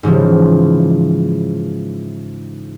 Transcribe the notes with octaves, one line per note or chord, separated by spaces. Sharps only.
G#2 C#3 E3 F3